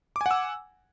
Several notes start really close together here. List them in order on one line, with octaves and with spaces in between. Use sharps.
D6 G#5 F#5 E6